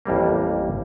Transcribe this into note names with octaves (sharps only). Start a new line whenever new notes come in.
A1 F2 G3 A#3